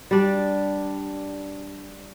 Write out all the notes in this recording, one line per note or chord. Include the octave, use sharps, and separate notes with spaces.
G3 D4